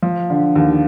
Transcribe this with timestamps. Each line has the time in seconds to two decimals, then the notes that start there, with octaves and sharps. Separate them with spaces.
0.03 F3
0.30 D3
0.56 D#2